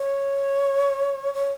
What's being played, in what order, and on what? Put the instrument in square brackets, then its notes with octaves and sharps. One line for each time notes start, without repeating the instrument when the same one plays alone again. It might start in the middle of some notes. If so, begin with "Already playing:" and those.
Already playing: [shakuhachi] C#5
C#5